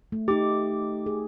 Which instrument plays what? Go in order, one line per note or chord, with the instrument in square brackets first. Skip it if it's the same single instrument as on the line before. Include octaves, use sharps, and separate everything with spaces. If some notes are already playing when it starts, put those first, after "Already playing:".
[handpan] A3
[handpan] A3 D#4 [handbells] G4 D6
[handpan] G#4